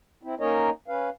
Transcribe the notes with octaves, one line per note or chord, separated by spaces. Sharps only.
C4 E4
A#3 C#4 D#4 A#4 C#5 D#5
C#4 B4 F5